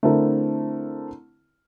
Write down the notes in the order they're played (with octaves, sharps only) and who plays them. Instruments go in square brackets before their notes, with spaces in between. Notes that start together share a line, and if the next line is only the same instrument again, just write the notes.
[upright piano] D3 A3 C4 E4 A#4